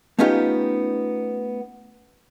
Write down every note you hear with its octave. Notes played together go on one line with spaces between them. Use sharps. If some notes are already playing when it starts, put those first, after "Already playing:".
A3 B3 C#4 D#4 F4 G4